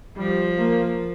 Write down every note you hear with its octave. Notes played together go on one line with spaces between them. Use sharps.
F3 G3
A#3